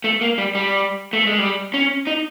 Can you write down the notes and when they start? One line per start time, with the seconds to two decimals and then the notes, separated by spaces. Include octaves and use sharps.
0.04 A3
0.21 A#3
0.38 G3
0.55 G3
1.13 A3
1.27 G#3
1.39 G3
1.74 C#4
2.07 D#4